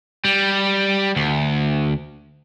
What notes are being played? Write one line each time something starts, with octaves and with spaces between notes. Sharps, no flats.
G3
D2